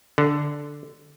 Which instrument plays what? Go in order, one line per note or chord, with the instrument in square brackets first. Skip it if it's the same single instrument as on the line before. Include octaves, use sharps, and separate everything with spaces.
[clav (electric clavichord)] D3